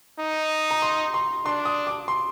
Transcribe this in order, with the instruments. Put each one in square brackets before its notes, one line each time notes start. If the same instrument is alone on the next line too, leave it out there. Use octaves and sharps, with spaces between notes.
[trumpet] D#4
[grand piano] A#5
C6
C6
[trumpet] D4 [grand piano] C6
[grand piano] D#6
D6
C6